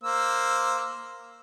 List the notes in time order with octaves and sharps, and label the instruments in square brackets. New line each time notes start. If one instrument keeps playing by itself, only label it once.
[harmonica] A#3 C5 E6